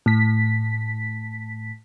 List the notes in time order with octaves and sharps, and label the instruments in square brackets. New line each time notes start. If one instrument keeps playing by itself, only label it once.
[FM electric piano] A2 B6